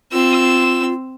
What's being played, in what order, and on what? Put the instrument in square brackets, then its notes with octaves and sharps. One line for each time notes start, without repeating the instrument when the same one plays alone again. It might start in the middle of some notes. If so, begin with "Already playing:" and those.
[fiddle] C4 E6 [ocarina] F4